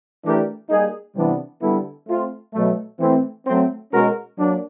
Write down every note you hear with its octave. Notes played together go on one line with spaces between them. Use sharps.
E3 A3 D4 G4 A#4
G3 A#3 D#4 G#4
C3 E3 G3 B3 D4
D3 G3 B3 E4 A4
A3 C4 F4
B2 F#3 A3
E3 A3 C4
F#3 A3 C4
B2 G#3 C#4 F#4 A#4
F#3 A#3 D4